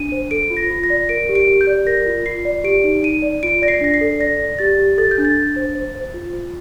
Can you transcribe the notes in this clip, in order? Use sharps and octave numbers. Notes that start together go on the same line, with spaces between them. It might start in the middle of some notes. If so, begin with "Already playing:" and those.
Already playing: D4 D#7
C5
A4 D7
F4
A#6
F4
A#6
D5
A#4 D7
G4
D7
G4
G6
D5
A#4 A#6
F4
F4 C7
D5
G4 D7
D#4
D#4 D#7
D5
F4 D7
D5 A#6
C7
D4 A#6
C7
A4
D5 A#6
D5
G4 A6
G4
A4 A6
G6
D4
A6
D4
C5
C5
C5
F4
F4